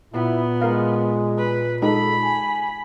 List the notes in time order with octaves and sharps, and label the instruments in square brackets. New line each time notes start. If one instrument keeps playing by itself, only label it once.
[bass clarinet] A#2 [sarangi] B3 [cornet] E4
[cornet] G#3 [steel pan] A#4 F5
[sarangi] B4
[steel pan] G#3 D#4 G4 [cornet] A4 [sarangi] B5
[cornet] G#5